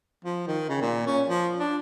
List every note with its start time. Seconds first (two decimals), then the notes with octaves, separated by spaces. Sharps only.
0.25 F3
0.47 D#3
0.69 C#3
0.81 A#2
1.06 C#4
1.28 F3
1.59 D4